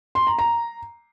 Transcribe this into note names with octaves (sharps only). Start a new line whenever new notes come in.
C6
A#5
A#5